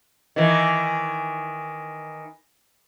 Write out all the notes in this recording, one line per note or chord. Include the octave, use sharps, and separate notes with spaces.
D#3 E3